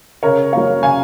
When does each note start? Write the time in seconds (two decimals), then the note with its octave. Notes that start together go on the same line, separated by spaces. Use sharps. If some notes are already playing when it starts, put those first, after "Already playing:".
0.23 C#3 A#4 C#5
0.52 F#3 A#3 C#5 F5
0.83 C#3 F5 G#5